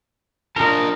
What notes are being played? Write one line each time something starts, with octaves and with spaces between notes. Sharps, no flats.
D4 F4 A#4 D#5 A5